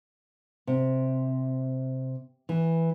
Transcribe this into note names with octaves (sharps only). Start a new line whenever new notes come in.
C3
E3